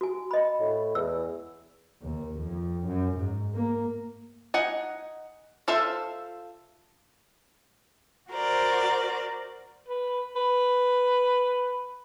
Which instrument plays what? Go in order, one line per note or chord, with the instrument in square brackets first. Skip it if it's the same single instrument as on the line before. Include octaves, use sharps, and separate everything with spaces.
[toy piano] F#4 G#5
D#5 B5
[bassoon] A2
[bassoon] E2 [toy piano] E6
[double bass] D#2
F2
F#2
G#2
A#3
[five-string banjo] D#4 F#5 G#5
F4 A4 C5 E5
[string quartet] F#4 A#4 C5 D5
[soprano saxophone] B4
B4